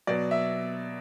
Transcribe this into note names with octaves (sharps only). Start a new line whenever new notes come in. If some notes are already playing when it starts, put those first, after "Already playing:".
B2 F#3 D5
E5